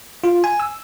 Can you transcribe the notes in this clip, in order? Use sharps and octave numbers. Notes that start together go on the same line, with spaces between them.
F4
G#5
E6